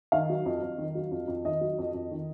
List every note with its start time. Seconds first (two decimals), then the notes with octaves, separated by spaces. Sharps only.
0.12 D#3 F5
0.29 F#3
0.46 F2
0.62 F2
0.78 D#3
0.95 F#3
1.11 F2
1.28 F2
1.45 D#3 D#5
1.61 F#3
1.78 F2
1.94 F2
2.11 D#3